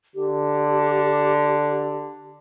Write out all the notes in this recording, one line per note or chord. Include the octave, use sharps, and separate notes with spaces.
D3 G4